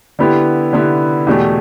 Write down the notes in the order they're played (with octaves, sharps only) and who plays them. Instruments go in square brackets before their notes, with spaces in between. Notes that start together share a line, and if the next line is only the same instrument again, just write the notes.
[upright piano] D3 B3 E4 G4
D3 B3 E4 G4
E2 B2 A3 G4